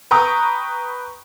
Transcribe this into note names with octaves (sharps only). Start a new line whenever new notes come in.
B4 G5 A#5 C#6 D#6